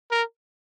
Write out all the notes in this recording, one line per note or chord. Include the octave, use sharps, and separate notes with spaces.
A#4